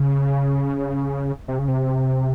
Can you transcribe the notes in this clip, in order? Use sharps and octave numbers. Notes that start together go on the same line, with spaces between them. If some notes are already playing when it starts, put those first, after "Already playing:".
Already playing: C#3
C3
C#3
C3